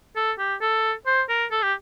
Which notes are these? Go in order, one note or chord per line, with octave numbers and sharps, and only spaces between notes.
A4
G4
A4
C5
A#4
A4
G4